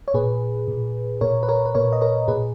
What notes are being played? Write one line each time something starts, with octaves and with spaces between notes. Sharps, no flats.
C#5
A#2 G#4 B4
A#2
A#2 A#4 C#5
B4
A#4 C#5
B4
A#2 A#4 C#5
D#5
A#4 C#5
A#2 G#4 B4